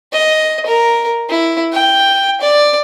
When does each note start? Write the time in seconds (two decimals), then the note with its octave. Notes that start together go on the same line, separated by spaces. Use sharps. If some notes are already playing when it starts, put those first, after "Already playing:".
0.13 D#5
0.66 A#4
1.30 E4
1.73 G5
2.41 D5